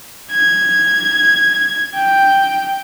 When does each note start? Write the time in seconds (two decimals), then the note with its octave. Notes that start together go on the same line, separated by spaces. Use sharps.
0.32 G#6
1.95 G5